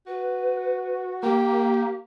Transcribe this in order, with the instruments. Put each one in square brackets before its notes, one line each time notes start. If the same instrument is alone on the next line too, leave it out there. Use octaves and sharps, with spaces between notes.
[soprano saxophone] F#4 [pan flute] B4
[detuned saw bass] A#3 [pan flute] G4 [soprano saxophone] G5